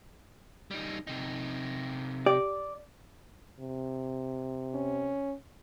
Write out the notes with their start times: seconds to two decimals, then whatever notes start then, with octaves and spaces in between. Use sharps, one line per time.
0.71 G3 D#4
1.07 C3 D#4
2.26 G4 D5
3.60 C3
4.75 C#4